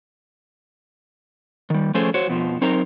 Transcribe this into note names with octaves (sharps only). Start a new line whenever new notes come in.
D#3 G3
F3 A3 C#4 G#4 A4 C5
F#4 C5 C#5
F2 B2 F3
F#3 C4 D#4 A#4 C5 A#5